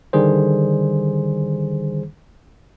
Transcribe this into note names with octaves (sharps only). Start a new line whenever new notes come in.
D3 D#3 G3 G#4 C5